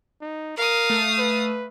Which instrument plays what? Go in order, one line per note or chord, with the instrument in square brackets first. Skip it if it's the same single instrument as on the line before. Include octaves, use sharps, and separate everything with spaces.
[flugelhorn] D#4
[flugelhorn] A#4 [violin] F5 D#6
[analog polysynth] A3
[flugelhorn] B4